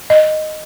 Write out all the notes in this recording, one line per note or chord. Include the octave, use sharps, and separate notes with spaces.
D#5